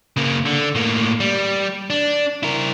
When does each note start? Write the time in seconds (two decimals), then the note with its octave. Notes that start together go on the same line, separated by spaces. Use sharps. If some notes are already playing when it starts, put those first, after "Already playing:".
0.17 C#3 A#3
0.46 D3
0.75 A2 A#3
1.20 G3
1.90 D4
2.43 E4 A#4